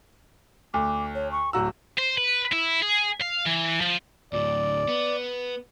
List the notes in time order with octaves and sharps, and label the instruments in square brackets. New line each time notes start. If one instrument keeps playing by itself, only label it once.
[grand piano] D2 [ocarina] D6
[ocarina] C#5
C#6
[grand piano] D1 F#4 E6 [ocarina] A#5
[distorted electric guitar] C5
B4
E4
G#4
F5
E3
F3
[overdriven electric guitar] D2 A2 [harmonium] D5
[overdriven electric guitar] B3